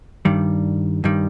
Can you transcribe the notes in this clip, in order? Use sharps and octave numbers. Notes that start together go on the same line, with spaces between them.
G2 D#3 G3
G2 D#3 G3